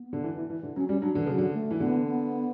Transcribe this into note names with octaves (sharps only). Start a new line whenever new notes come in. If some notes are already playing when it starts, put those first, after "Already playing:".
Already playing: B3
D3
E3
E3
E3
D3
F#3 C#4
G3 C#4
F#3 D4
D3 E3
C#3 F#3
D3
A3
E3
D3 B3
B3